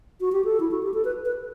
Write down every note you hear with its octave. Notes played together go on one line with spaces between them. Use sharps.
F#4
G4
A4
E4
F#4
G4
A4
B4
B4